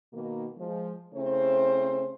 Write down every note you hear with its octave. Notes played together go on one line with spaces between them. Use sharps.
B2 D#3 A#3
F3 G#3
C#3 A3 C4 E4 C5